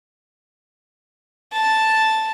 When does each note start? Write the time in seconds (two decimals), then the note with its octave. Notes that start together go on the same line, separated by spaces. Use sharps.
1.53 A5